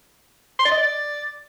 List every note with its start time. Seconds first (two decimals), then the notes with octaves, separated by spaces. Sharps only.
0.59 C6
0.65 D5
0.72 D#5
0.78 D5